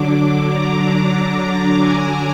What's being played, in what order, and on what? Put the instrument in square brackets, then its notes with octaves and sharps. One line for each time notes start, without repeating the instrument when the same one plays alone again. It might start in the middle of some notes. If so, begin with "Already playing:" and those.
Already playing: [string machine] D3 F#3 D4 D6
A#5
G#5